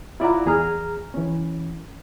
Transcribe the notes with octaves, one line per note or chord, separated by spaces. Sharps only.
E4 F4 D5 E5 F#5 A#5
E2 G#4 A#5 F6
E3 C#4